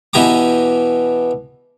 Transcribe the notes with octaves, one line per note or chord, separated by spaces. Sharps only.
B2 E3 G4 G#5 A#5 D6